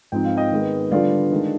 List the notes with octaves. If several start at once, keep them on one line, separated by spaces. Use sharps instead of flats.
G#2 F3 C4 D#4 G5
F5
D#5 G5
D#3 G#3 B3
D3 G3 B3 D4 F4 D5 F5
D#3 G#3 D4